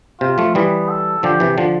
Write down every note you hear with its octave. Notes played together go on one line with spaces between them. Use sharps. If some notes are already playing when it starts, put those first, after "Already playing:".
C3 F4
F3 A3
E3 G3 B3
A4
D3 F3 G4
C3 E3
D3 F3